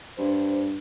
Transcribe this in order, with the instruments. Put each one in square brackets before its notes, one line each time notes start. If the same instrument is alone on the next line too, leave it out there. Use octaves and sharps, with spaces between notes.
[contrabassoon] G2 [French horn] C5